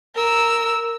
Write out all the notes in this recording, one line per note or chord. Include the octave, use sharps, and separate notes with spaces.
A#4 E6